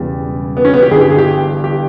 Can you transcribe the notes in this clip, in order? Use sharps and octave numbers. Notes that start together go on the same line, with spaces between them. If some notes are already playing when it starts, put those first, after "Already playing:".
Already playing: E1 E2 C#3 G3
B3
C#4
B3
G4
G1 G2 E3 G#4
G4
G#4
G4
G4